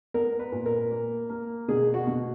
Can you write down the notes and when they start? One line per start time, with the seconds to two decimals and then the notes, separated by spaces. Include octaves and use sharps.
0.14 B3 A#4
0.39 B4
0.52 A#2
0.66 A#4
0.91 A#3
1.29 A#3
1.68 B2 G#4
1.94 F#4
2.07 B2